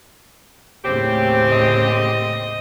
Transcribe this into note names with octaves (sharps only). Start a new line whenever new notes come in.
D#2 A2 C#3 C4 G4
D#5